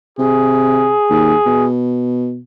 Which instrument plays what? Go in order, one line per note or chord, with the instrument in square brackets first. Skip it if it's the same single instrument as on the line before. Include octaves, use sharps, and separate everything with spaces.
[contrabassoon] C3 [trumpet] G#4
[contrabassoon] D#2
B2